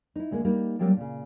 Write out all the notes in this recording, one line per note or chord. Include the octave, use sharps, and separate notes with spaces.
D#4 E4
D2 G#3 A#3
G3 A#3 D#4
F#3 G3 A#3 C4 D4
A#2 C#3